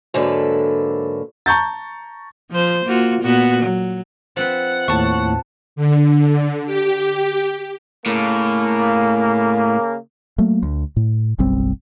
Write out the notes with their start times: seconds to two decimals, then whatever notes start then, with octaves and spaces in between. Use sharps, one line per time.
0.14 G#2 D3 F#3 A#3 A4 B4
1.46 A5 A#5 C#6 G6 A6
2.51 F3 C5
2.85 A#3 F4 F#4
3.22 A#2 B3 F#4
3.63 F#3
4.37 F3 C4 B4 F#5
4.88 D#2 A2 A5 C#6
5.76 D3
6.66 G4
8.06 A2 C#3 A#3
10.38 F#3 A3 A#3
10.63 D2
10.96 A2
11.39 F#1 B1 G3 C4